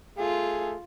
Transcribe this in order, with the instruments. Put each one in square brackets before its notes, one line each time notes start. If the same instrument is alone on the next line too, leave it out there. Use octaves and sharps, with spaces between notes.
[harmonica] A3 G#4 [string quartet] F4